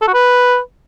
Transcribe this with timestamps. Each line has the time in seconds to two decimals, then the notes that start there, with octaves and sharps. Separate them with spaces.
0.02 A4
0.08 F#4
0.14 B4